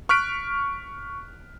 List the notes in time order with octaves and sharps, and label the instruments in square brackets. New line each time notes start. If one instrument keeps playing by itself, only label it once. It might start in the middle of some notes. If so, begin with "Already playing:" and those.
[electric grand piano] C#6 F6 F#6 B6 D7